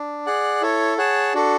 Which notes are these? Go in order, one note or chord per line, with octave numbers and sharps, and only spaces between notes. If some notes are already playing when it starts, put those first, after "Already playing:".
Already playing: D4
G#4 D5 F#5
E4 A4 C#5
G#4 C#5 F#5 A5
D4 F#4 A4